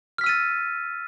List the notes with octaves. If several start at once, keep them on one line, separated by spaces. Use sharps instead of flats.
E6 F6 A6 B6 D#7